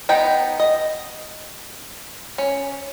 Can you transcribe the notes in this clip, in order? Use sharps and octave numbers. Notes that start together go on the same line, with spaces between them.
B3 D#4 G5 A#5
D#5
C#4